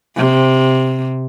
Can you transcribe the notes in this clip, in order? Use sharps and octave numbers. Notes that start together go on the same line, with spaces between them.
C3